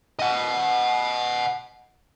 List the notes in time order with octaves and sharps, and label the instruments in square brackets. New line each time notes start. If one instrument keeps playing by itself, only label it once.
[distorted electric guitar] D#5 F#5